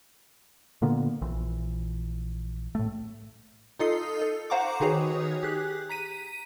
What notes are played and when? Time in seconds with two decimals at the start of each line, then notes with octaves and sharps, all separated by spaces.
0.82 A#2 D3 A#3 B3
1.22 A#1 E3
2.75 A2 A3
3.79 D#4 F4 A4 D#5 D#6 C7
4.22 A4
4.50 C5 F5 F#5 A#5 C#6 D6
4.80 D#3 D#4 F#4 G#4 B4 C#5
5.43 G4 G#4 F#6
5.89 A#5 B6 D#7